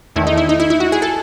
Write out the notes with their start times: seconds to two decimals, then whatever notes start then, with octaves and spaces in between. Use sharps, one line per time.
0.16 E2 D#3 A3 E4
0.27 D#4
0.38 E4
0.49 D#4
0.60 E4
0.70 E4
0.80 F#4
0.92 G#4
1.02 A4